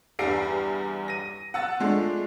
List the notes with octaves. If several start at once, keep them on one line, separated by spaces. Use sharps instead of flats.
E2 G2 G3 C7 D7
A#6 D#7
F#5 E6 A6
F3 G#3 A3 D4